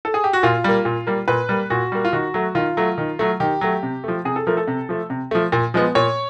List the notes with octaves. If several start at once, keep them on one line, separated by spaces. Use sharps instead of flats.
A4
G#4
G4
F#4
A#2 F4
G3 A#3
A#2
G3 A#3
A#2 B4
G3 A#3
A#2 F#4
G3 A#3
F4
D#3 F#4
F#3 A3
D#3 F4
F#3 A3
D#3
F#3 A3
D#3 G4
F#3 A3
C3
F3 A3
C3 G#4
A4
F3 A3 A#4
A4
C3
F3 A3
C3
F3 A3
A#2
F3 G#3 B3
A#2 C#5